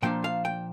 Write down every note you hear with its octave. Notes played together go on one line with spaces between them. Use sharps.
A#2 F3 A#3 D4 G5
F5
G5